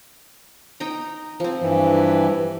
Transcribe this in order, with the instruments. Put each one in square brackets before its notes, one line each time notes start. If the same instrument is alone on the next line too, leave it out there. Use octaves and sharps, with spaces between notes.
[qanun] D#4 G5 A#5
F3 C4
[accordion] G2 E3